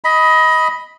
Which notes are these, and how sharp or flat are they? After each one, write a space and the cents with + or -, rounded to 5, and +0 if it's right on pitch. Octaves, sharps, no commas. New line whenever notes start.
D#5 +20 B5 +0